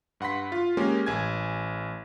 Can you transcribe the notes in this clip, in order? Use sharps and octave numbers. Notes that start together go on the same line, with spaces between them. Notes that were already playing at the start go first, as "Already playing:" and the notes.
G2 F#5 C6 B6
F4
G#3 A#3 C#4 G4
A1 G#5 G#6